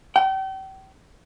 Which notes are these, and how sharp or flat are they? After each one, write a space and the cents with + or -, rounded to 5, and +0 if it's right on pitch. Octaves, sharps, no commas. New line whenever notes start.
G5 -35